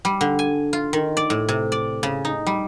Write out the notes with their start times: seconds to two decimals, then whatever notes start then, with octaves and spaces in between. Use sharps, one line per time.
0.05 G3
0.21 D3
0.39 G#5
0.73 F4
0.93 D#3
1.17 D5
1.30 A2
1.49 C3
1.72 D5
2.03 C#3
2.25 D#4
2.46 G3